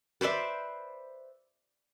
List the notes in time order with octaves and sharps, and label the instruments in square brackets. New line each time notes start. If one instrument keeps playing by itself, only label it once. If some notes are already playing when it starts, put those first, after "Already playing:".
[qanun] B4 C5 D5 E5